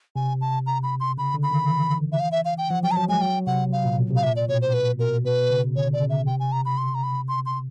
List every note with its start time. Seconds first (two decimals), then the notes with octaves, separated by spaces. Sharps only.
0.16 C3 G#5
0.41 A5
0.66 A#5
0.83 B5
1.00 C6
1.18 C#3 B5
1.34 D3
1.43 B5
1.51 D#3
1.69 E3
2.12 E5
2.20 F5
2.32 E5
2.45 F5
2.58 G5
2.70 F3 F#5
2.83 F#3 G5
2.91 A#5
2.96 F#3 A5
3.09 G#3 G#5
3.21 F#3 G5
3.47 C3 F#5
3.72 F5
3.85 A#2
3.98 B2
4.10 C3
4.16 F5
4.23 A#2 E5
4.36 D5
4.49 B2 C#5
4.62 C5
4.74 B4
4.99 B2 A#4
5.25 B2 B4
5.51 C#3
5.76 D3 C#5
5.93 D5
6.02 C#3
6.10 E5
6.27 C3 G5
6.40 G#5
6.52 A#5
6.65 B5
6.78 C6
6.95 A#5
7.03 B5
7.28 C6
7.46 C6